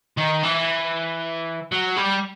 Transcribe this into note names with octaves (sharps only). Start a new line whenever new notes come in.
D#3
E3
F#3
G3